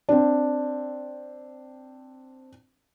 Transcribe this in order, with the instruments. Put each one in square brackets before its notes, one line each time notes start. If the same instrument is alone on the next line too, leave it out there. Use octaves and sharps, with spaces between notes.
[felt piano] C4 D4